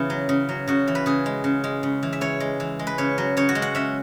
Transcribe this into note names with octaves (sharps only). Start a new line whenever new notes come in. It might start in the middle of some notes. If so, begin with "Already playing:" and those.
Already playing: C#3 E3 B3 E4
F#3
C#3
F#3
C#3 F#4
E3
B4
C#3 G#4
G#3
C#3
G#3
C#3
E3
E5
E3 C#5
G#3
E3
G#3
B4
C#3 C#5
F#3
C#3 C#5
F#4
G#3
F#5
C#4 E5